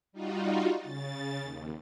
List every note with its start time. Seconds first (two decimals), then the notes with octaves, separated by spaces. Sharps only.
0.12 G3 D#4 F4 F#4
0.79 C#3 A6
1.42 D#2